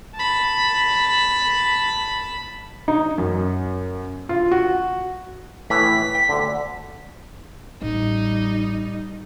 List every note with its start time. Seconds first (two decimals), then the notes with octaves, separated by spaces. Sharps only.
0.15 A5 B5
2.88 D#4
3.18 F#2
4.29 F4
4.52 F#4
5.70 A2 E3 B6
6.15 G5
6.29 D2 D3
7.82 A1 G3 D#4